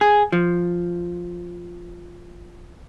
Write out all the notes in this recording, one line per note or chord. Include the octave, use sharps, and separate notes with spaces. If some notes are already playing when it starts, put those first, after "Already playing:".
G#4
F3